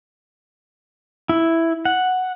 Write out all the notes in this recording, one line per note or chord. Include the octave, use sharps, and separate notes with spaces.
E4
F#5